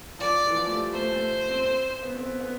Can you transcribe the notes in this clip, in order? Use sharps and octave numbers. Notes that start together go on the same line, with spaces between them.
F3 D5
E3
F3
A3
G3
A3 C5
A3
C4
C4
B3
C4
B3
B3